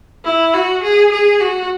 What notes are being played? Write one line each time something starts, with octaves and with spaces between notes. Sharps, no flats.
E4
F#4
G#4
G#4
F#4